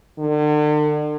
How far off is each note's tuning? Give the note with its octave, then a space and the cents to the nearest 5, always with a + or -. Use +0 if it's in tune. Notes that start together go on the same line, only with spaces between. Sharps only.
D3 +40